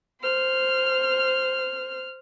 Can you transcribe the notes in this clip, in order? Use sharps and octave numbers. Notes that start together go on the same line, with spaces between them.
C5 F6